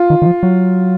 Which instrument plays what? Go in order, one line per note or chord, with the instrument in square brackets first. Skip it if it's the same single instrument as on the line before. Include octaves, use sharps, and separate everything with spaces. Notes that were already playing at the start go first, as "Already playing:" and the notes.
Already playing: [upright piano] F4
[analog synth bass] D#3
D#3
F3
F#3